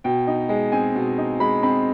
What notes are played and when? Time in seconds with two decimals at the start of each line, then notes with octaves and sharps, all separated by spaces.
0.04 B2 G5
0.27 D#4
0.49 G#3
0.72 C4 G#5
0.95 B2
1.18 D#4
1.40 G#3 B5
1.63 C4 B5